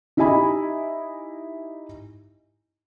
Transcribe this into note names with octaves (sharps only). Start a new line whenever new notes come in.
D#4 E4 G4 D#5 G#5 B5